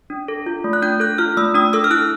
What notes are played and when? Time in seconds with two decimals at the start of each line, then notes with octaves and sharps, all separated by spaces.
0.10 D4
0.28 A4
0.46 F4
0.64 A3
0.73 F#6
0.82 D4 G6
1.00 A4 F#6
1.18 F4 F6
1.37 A3 E6
1.54 D4 D#6
1.73 A4 E6
1.84 F6
1.91 E4 F#6